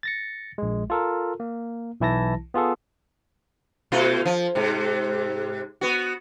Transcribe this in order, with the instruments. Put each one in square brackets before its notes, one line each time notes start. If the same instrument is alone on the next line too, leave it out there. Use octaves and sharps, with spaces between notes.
[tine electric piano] A6 A#6 C#7
A#1 G#3
F4 A4 A#4
A#3
B1 E3 E4 A5 A#6
B3 F4 G#4 A4
[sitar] B2 A3 F4
F3
G#2 C3
B3 F#4